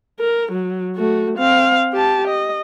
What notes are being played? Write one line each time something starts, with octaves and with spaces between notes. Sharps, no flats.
A#4
F#3
A3 F#4
C4 F5
G4 A5
D#5